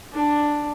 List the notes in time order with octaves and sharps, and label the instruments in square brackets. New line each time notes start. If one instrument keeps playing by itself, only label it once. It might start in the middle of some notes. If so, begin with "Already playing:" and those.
[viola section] D4